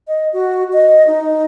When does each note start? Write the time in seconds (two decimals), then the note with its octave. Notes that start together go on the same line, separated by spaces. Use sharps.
0.08 D#5
0.33 F#4
0.73 D#5
1.07 D#4